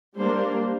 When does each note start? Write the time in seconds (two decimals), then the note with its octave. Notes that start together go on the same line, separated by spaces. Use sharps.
0.18 G3 A#3 D4 C5